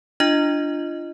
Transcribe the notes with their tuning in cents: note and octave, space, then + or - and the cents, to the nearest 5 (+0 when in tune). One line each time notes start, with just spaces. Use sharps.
D4 +0 F4 -35 D#5 +0